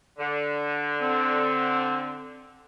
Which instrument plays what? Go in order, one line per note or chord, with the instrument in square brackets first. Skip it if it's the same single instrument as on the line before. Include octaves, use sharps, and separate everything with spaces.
[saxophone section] D3
[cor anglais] C4